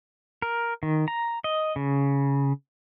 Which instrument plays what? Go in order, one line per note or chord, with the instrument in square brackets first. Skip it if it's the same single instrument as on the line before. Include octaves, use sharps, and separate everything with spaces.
[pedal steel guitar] A#4
D#3
A#5
D#5
C#3